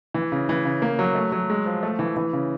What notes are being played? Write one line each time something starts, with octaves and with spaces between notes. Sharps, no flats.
E3
C#3
E3
C#3
A#3
F#3
A3
F#3
G#3
F3
A3
E3
E3
C#3